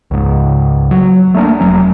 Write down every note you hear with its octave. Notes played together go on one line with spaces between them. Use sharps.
C#2 G#2
F#3
A3 A#3 C#4 D4
F1 F#3 C#4